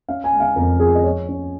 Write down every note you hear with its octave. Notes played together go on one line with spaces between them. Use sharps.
C#4 F5
G#5
G#3
F5
F2 A#4
F3 G#4
D#5
F3 C#5
C#4